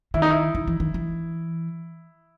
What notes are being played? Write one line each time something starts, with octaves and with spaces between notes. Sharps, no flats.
D#3 E4
D#4
E4
D#3
E3
D#3
E3